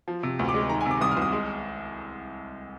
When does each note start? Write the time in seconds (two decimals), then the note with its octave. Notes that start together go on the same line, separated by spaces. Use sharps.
0.08 F3
0.23 C3
0.39 D2
0.49 D6
0.54 G#3
0.69 D#3 A#5
0.81 G#5
0.85 C3
0.91 D6
1.01 C2 D#6
1.11 F6
1.17 C2 D#6
1.32 G#3